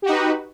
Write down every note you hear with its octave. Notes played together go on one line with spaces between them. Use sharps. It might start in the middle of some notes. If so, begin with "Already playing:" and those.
D#4 F#4 G4 B4